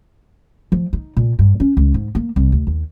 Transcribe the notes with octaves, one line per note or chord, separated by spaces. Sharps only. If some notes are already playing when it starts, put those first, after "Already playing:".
F3
D#4
A#2
G2
C#4
C#2
G#2
A#3
C2
D2
D#2